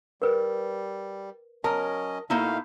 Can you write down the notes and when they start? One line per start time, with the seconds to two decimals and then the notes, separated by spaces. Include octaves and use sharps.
0.22 G3 A#4 B4
1.64 F#3 C#4 A#4 D#5 A5
2.30 B2 A3 A#3 D#4 E4 F5